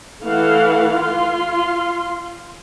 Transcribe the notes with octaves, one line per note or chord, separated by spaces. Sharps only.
E3 A3 F5 F#5
F4 C6